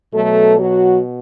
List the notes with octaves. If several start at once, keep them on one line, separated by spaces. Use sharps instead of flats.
B2 F#3 A3 A4
F#3 F#4